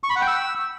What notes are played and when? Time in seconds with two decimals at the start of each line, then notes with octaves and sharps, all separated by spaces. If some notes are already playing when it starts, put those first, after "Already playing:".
0.04 C#6
0.10 B5
0.16 F#5
0.21 G5
0.27 E6